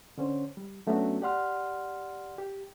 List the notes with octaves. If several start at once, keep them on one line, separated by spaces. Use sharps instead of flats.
D3 C#4 C5 C#5
G3
F#3 A3 B3 C#4 D4 F#4
G4 D5 F#5 C6 F6
G4